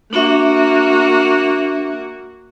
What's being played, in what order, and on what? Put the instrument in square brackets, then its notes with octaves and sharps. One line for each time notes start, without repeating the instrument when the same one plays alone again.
[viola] A#3 F#4 [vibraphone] D4 E5